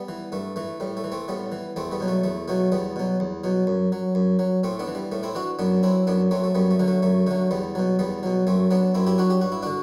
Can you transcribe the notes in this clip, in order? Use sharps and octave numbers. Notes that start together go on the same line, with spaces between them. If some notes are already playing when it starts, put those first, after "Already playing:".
Already playing: G3 B3
E3
G2 A3
E3 A3
A2 G3
A3
E3
A3 C4
A2 G3 B3
E3
E2 A3 C4
G3 B3
B2 F#3
A3
E2 A3
B2 F#3 A3
E2 G3 B3
B2 F#3
E2
B2 F#3
F#2
F#3
F#2
F#3
A2 A3 C4
B3 D4
E3
G3
A2 A3
C4 E4
E3 D4 F#4
F#2 B3 D4
F#3 C4 E4
F#2 B3 D4
F#3 A3 C4
A3
F#2 G3 B3
A3
D3 F#3
A3
F#2 A3
D3 F#3 A3
E2 G3 B3
B2 F#3
E2 G3 B3
B2 F#3
F#2 A3 C4
F#3 B3 D4
F#2 C4 E4
E4 G4
F#3 D4 F#4
G4
G2 F#4
E4
D3 D4 F#4